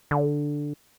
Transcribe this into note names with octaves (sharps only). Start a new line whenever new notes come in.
D3